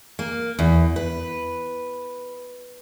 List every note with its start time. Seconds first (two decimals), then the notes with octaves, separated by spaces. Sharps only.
0.19 A#3
0.59 E2
0.96 B4